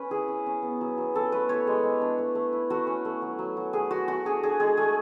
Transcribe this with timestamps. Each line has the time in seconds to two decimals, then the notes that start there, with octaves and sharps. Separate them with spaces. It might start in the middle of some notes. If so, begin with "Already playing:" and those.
Already playing: C#4 B4
0.11 E4 G#4
0.28 C#4
0.46 C#4
0.62 B3
0.81 F#3
0.97 F#3
1.14 C#4 A4
1.32 A3 B4
1.49 E4 C#5
1.67 G#3
1.83 G#3
2.01 D4
2.19 A3
2.35 A3
2.53 E4
2.70 A3 F#4
2.87 C#4
3.05 A3
3.22 F#3
3.39 F#3
3.57 F#3
3.73 A3 G#4
3.91 A3 F#4
4.08 A3 F#4
4.25 D4 G#4
4.43 D4 G#4
4.60 G#3 G#4
4.77 A3 G#4